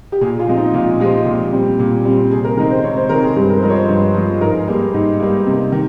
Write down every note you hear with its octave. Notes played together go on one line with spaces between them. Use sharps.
G4
A#2 G#4
F4
F3 G#3 C4
D#4
A#2 F4
F3 G#3 C4 G4
A#2
G3 C4
A#2
G3 C4
C3 G#4
A#4
D#3 G#3 C4 A#4
C5
C3 C#5
C5
D#3 G#3 C4 A#4
G#4
G2 G4
A#4
C5
F3 G#3 A#4
C#5
C5
G2
F3 G#3
G#2 A#4
G#4
G3 A#3
G#2
G3 A#3
C3
D#3